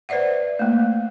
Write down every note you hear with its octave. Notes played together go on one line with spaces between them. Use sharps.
B4 C5 D5 E5 F#5
A3 A#3